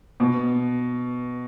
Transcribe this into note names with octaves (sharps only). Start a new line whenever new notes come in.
B2